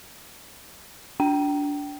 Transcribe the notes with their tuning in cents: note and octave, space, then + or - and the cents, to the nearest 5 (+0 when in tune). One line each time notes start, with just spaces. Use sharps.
D4 -20 G5 -20